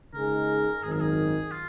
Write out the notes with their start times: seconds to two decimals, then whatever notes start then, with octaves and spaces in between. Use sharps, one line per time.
0.14 C#3 G#3 D#4 G#4 A#4
0.83 G#1 F#2 D#3 F#3 G#4
0.92 A#4
1.01 G#4
1.51 F4